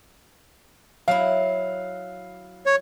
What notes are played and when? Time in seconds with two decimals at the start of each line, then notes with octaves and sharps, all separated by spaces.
1.08 F#3 E4 F5
2.66 C#5